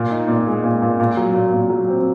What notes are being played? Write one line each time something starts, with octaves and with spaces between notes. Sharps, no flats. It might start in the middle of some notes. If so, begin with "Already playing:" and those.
Already playing: A#2
D#4
A#2
G#3
A#2
A#2
A#2
F#3
A#2
A#2
F#3
C4